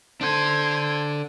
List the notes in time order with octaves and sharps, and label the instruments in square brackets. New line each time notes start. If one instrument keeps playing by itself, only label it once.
[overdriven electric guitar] D4 A4 [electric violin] C5 G#6